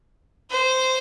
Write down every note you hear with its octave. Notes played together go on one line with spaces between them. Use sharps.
C5